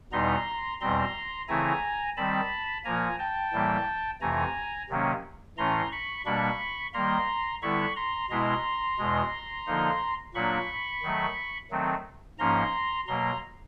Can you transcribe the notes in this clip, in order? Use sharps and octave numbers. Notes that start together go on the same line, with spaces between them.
E2 B2 G3 B3 D#4 A#5 C6
E2 B2 G3 C4 A#5 C6
C#3 E3 A3 C4 E4 G#5 A#5
D#3 G3 C4 A5 B5
A#2 F3 A#3 G#5 A#5
G5 A5
A2 E3 G3 A#3
F2 C3 E3 A3 G#5 A#5
C3 D#3 F#3 A#3 C#4
A2 E3 A3 C#4 A#5 C6
B5 C#6
B2 G3 A#3 D4 B5 C#6
D#3 G3 A#3 A#5 C6
D3 G3 B3 E4 B5 C#6
A#5 C6
B2 G#3 B3 E4 A#5 C6
E2 B2 G#3
D3 F3 A#3 D#4
A#2 F#3 A#3 D4 B5 C#6
D#3 F#3 A3
D#3 F#3 A3 C4
G#2 F3 A#3 C#4 A#5 C6
B2 F#3 A#3 A#5 C6